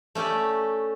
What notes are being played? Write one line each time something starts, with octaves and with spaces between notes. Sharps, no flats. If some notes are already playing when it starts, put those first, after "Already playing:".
A3 C#4 G4 D5